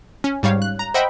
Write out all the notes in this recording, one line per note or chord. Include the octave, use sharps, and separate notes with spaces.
C#4
G#2 G3 C#5 F5
F#6
A#5
C5 D#5 E5 F#5 G5 B5